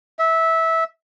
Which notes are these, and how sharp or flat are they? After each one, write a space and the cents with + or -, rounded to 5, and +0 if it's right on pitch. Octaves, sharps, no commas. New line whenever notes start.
E5 -15